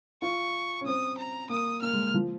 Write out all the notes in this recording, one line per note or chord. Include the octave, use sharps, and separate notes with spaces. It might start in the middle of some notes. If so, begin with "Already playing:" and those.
F4 C#6
C#4
C4 D#6
A#5
A#3 D#6
A#3 F6
G#3
F3